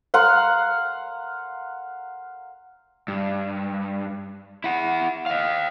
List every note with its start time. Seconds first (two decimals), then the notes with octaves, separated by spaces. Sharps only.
0.14 F5 F#5 A#5 C6
3.08 G2
4.64 E4 F#5
5.26 D#5 F5